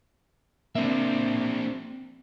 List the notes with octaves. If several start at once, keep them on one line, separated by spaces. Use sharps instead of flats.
A#3 C4 D4 E5